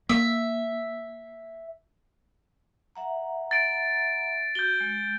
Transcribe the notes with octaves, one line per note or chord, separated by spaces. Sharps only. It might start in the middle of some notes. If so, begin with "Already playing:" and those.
A#3 E5
E5 F#5 A#5
A6 D7
F#4 G6 G7
G#3